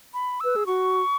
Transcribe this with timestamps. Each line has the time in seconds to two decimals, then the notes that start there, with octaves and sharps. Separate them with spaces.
0.14 B5
0.40 B4 E6
0.56 G#4
0.66 F#4 C#6